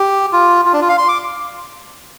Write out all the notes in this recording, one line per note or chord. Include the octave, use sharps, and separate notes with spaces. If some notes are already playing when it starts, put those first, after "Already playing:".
Already playing: G4
F4
F4
D4
F4
F5
C6
D6